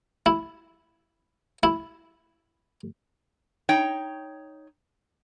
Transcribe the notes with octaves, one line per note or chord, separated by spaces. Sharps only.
E4
E4
D#4 C#5 G5